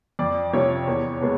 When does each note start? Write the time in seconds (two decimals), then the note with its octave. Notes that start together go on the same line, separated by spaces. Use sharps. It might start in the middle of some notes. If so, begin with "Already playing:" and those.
0.19 F2 D5
0.53 C3 F3 C#5
0.87 E2
1.21 B2 G#3 B3